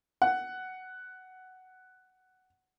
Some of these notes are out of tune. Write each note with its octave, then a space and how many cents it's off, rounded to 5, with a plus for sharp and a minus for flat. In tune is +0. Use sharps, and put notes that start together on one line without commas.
F#5 +10